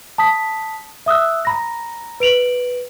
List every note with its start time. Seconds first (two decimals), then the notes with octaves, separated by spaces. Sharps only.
0.18 A5 D#6 B6
1.06 E5 D#6 E6 F#6
1.45 A#5 B5 A#6
2.20 B4 D7 F7 F#7